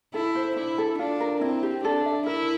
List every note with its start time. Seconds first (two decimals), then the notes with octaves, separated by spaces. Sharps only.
0.14 E4 A4
0.35 C5
0.56 D4 E4
0.78 A4
0.99 D4 F4
1.20 A#4
1.41 C4 E4
1.63 G4
1.84 D4 A4
2.06 E5
2.26 E4 A#4